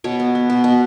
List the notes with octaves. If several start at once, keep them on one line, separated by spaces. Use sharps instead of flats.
B2 C#5
B3
B3
B2
B2